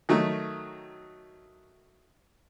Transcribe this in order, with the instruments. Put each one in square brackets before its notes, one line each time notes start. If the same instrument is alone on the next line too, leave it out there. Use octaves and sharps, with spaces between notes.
[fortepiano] D#3 F#3 A3